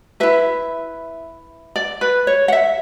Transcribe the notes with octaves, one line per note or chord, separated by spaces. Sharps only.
E4 B4 E5
D5
B4
C#5
F#5
E5